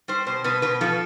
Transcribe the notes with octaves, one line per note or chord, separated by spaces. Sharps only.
G3 C5
B2 C5
B2 B4
B2 B4
F3 A4